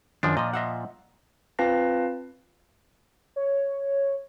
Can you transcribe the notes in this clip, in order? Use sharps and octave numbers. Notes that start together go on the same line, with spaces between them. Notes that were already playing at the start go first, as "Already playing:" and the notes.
F#2 D#3 F3 D4
A#2 F3 D#5
D#5 E5 F#5
C4 F4 B4 F5 A5 A#6
C#5